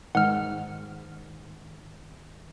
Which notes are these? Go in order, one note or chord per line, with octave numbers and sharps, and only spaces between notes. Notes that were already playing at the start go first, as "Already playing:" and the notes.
G#2 D#3 F#5 F6